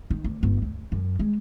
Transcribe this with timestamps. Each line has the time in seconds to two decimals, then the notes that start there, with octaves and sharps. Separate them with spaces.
0.11 D#3
0.24 D2
0.43 G1
0.62 D2
0.92 F#2
1.19 G#3